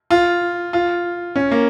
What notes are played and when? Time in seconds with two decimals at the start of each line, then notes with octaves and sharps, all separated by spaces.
0.10 F4
0.73 F4
1.36 C#4
1.51 A#3